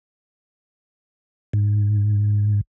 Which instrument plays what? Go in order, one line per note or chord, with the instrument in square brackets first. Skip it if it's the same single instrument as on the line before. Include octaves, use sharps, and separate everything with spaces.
[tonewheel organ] G#2